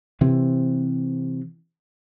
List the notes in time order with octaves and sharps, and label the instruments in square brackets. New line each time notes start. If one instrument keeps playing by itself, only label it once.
[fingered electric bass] C3 E3 C4